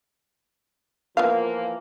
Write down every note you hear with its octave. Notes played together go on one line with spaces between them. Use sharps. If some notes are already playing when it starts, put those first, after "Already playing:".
E3 F3 A#3 B3 F4 F5